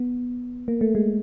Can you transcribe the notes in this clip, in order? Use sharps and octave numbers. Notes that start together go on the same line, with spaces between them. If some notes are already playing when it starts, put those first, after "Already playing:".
Already playing: B3
A#3
A3
G#3